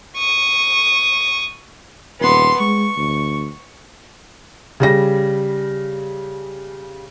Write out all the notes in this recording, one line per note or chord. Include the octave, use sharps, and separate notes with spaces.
C#6 D#6
D#1 B3 C6
G#3 C#6
D2
C#3 G3 A#6